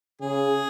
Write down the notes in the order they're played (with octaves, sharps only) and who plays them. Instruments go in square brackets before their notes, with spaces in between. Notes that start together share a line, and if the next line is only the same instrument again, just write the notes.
[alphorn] C#3 [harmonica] G#4